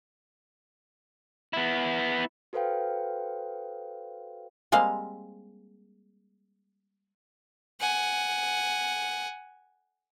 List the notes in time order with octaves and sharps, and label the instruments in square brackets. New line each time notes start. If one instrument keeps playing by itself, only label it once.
[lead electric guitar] B3 E4
[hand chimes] F#4 A4 B4 C5 F5 G5
[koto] G3 G#3 A#3 C4 F5
[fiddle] F#5 G#5